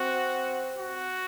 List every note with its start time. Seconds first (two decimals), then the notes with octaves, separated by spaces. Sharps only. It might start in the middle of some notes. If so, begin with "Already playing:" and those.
Already playing: C4 F#4
0.78 F#4